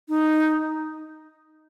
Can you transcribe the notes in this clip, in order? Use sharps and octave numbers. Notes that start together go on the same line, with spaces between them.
D#4